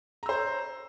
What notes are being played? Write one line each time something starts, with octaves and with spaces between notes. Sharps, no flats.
C5 C#5 A#5 E6